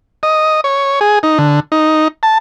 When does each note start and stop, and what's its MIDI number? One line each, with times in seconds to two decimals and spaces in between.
0.23 0.61 75
0.64 1.00 73
1.01 1.19 68
1.23 1.38 63
1.38 1.60 50
1.72 2.08 63
2.23 2.38 81